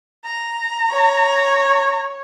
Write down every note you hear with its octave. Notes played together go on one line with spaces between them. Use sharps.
A#5
C#5